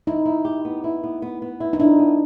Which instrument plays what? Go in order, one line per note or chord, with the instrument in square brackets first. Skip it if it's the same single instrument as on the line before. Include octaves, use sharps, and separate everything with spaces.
[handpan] D#4 [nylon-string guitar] E4
[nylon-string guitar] E4
G4
B3
E4
B3
B3
B3
E4
[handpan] D#4
[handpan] D4 [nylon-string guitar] E4
[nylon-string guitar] B3